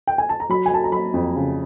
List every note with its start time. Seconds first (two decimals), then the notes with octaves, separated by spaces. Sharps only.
0.07 G5
0.18 G#5
0.29 A5
0.40 A#5
0.49 F#3 B5
0.66 G#5
0.71 F#3 A5
0.84 A#5
0.92 F#3 B5
1.14 F2
1.35 C#3